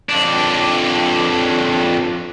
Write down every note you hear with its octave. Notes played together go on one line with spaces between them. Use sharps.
F2 D4